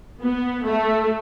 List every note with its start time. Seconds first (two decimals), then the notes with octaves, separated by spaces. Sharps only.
0.21 B3
0.65 A3